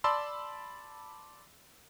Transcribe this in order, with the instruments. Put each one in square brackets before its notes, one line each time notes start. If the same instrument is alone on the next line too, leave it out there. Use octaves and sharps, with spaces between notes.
[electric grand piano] D5 A5 B5 C6 E6